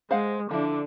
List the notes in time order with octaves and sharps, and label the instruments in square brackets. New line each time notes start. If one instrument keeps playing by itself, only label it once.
[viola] G#3 [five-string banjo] C5 F5 F#5
[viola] D3 D4 [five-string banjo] F3 E4